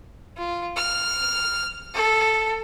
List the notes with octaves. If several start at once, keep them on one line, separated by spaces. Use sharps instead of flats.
F4
F6
A4